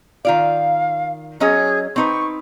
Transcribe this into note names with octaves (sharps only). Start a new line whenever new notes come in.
D#3 F4 D5 F5
F#3 C#4 G#4 D#5
C4 D#4 B4 C#6